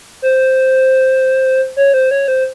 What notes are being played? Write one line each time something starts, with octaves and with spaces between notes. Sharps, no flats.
C5
C#5
C5
C#5
C5